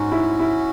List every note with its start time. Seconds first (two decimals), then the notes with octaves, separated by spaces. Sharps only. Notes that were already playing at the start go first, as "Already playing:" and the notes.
Already playing: G#2 C#4 F#4
0.12 E4
0.40 E4